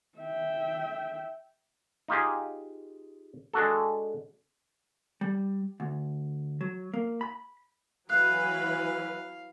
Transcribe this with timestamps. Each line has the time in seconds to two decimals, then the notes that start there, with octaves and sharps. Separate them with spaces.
0.19 E5 G5
2.08 D#4 F4 G4 G#4
3.54 G#3 D4 F#4 A4
5.21 G3
5.80 D2
6.61 F#3
6.94 A#3
7.21 B5
8.10 E3 F#3 B4 F5 F#6